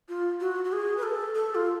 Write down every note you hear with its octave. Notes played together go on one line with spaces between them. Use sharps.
F4
F#4
F#4
G#4
B4
A4
A4
F4